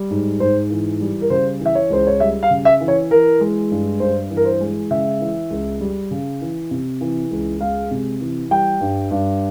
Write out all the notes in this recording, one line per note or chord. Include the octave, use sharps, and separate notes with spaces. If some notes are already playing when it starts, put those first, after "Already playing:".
Already playing: G3
G#2
G#2 C5
E3
G3
A#4
C#3 C5
E3
E5
C#5
C#2 C5
C#5
G3 E5
F5
C#3
E5
E3
C#5
E3 A#4
G#3
G2
G2 C5
E3
A#4
C5
G#3
C#3 E5
E3
C#2
G3
C#3
E3
C3
E3
C#2
G#3 F5
C3
E3
G3 G5
G2
G2